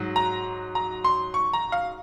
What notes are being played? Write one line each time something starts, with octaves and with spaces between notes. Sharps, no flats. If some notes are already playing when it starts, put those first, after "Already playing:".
Already playing: G#2 F#3
A#5
A#5
C6
C#6
A#5
F5